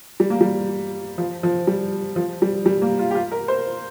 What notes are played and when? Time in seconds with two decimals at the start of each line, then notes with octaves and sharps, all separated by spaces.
0.20 G3
0.30 A#3
0.41 G3
1.18 F3
1.43 F3
1.67 G3
2.16 F3
2.42 G3
2.66 G3
2.82 A#3
2.99 F4
3.11 G4
3.15 F4
3.32 A#4
3.48 C5